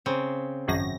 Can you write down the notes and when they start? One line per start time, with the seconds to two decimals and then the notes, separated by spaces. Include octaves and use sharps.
0.06 C#3 C4
0.68 G#1 F#2 A#6